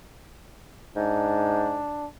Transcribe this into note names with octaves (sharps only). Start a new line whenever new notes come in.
G#2 D4